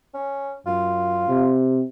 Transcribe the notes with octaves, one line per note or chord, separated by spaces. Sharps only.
C#4
F#2 F4
C3